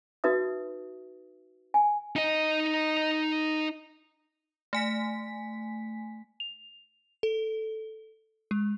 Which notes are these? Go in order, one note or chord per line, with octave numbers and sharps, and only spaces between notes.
D#4 F#4 B4 E5 D#6
G#5
D#4 D#5
A3 G#5 B6
F7
A4
G#3